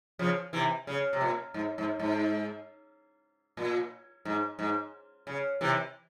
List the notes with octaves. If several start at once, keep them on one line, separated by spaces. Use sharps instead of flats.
C#3 F3
C3 E3
C#3
C3
A#2
G#2
G#2
G#2
A#2
G#2
G#2
C#3
C3 E3